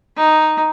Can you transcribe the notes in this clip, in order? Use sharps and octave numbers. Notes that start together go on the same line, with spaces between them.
D#4